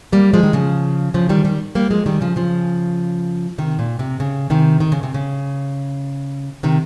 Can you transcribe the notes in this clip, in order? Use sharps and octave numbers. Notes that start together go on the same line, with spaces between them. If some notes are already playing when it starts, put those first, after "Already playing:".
G3 A#3
F3 G#3
D#3
C#3 F3
C#3 F3
D#3 G3
D#3 G3
G3 A#3
F3 G#3
D#3 G3
C#3 F3
C#3 F3
C3 D#3
A#2
C3
C#3
C3 D#3
D#3
C#3
C3
C#3
C3 D#3